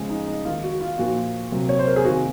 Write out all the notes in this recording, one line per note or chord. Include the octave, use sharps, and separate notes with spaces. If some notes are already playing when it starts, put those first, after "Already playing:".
Already playing: C#3 F3 G#3
D#4
D#4
D#3 G#3 F4
F#4
F4
A#2 F3 A#3 F#4
C3 F#3 A#3
C#5
C5
A#4
G#4
C3 D#3 A#3 F#4